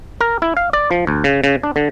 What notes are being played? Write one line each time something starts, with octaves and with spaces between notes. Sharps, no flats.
A#4
E4
F5
D5
F3
D2
C#3
C#3
D4
D3